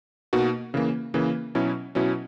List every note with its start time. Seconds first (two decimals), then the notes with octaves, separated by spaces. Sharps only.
0.33 B2 A#3 D#4 F#4
0.74 C#3 E3 A#3
1.14 C#3 E3 A#3
1.55 B2 F#3 C#4 E4
1.95 B2 F#3 C#4 E4